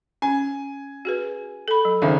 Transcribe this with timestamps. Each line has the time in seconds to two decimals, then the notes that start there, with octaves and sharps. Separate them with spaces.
0.22 C#4 G#5
1.05 F#4 G#4 B4
1.68 A4 B5
1.85 F#3
2.02 G#1 C#3 C5 E5 F5